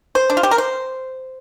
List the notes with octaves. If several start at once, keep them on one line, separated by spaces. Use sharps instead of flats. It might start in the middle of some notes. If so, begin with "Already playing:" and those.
C5
D4
F4
G4
A#4
C5